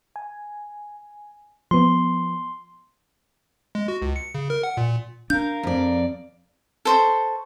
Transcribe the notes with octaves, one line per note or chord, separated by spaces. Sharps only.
G#5
F3 B3 C6
G#3
F#4
C#2
C#7
C#3
A#4
F#5
A#2
D4 A#4 F5 G6
F2 D5
A4 C5 C#6